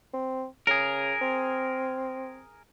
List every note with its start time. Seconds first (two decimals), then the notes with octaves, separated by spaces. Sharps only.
0.13 C4
0.67 C#3 G#4 A#4
1.21 C4